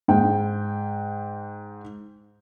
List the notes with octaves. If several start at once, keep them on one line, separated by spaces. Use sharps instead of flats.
G#2 G5